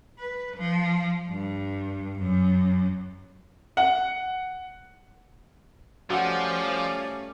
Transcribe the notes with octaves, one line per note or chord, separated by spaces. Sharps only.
B4
F3
G2
F#2
F#5
F3 G3 A3 C#4 F#4 D5 F#5